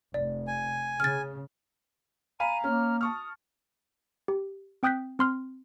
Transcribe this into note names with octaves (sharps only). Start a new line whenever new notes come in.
F1 D5
G#5
C#3 F6 A6
F5 G#5 A#5 B5 D#7
A#3 C#4 F6
A5 C#6 D#6 F6
G4
C4 G5 D#6 F#6 G6 B6
C4 C6 F6